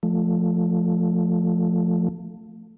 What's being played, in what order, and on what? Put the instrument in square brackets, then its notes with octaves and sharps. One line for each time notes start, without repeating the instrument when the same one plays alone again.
[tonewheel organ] F3 A3